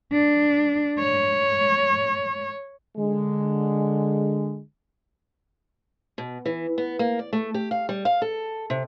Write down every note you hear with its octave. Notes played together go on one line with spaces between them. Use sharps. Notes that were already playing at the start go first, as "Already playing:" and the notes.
D4
C#5
D3 G#3
B2
E3
B3
A#3
D5
A3
G4
F5
G3
F5
A4
C3